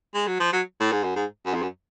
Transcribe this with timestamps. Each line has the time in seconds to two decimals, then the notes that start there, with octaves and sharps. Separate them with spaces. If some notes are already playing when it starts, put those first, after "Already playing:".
0.14 G#3
0.27 F#3
0.40 F3
0.53 F#3
0.80 A2
0.92 G#2
1.03 F#2
1.16 G#2
1.46 F#2
1.54 F2
1.62 F#2